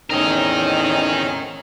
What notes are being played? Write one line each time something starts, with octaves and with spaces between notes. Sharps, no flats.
E2 A2 C4 C#4 D#4 A#4 D#5